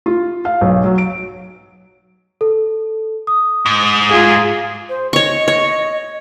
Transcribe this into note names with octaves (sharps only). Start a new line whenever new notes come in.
F4
F5
B1
F#3
D7
A4
D#6
G#2
F4 G#4
C5
C#5 D#5 C#6
C#5